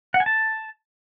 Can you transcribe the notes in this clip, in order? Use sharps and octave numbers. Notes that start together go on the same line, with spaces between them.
F#5
G#5
A5